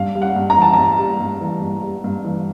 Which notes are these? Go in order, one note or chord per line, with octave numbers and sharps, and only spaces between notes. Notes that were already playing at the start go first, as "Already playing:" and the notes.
Already playing: G2 F5
G3
F#5
G2
A#5
E3 A5
G2 A#5
G3
G2
E3
G2
G3
G2
E3